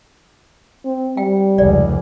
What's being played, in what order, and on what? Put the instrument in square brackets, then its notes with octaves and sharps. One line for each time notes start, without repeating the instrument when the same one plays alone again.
[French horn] C4
[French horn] G3 [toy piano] G5
[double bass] F1 C#2 [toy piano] D5